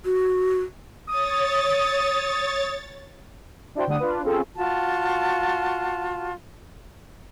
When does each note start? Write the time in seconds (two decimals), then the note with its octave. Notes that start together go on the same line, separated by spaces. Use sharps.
0.05 F#4
1.09 C#5 D#6 A6
3.75 D4 E4 F#4 C5 G5
3.87 D3 G3 A3 D4 F#5 D#6
4.00 D4 F4 B4
4.23 C4 C#4 F4 G#4 A4
4.55 F4 F#4 A5